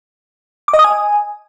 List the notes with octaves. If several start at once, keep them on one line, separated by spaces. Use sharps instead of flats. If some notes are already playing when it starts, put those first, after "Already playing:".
D6
D#5
D#6
G#5